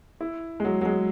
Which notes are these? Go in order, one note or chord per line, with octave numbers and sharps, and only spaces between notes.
E4
G#3
F#3
F#3
G#3